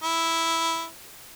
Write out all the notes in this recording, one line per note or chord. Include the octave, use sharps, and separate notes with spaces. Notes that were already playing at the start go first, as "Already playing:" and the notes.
E4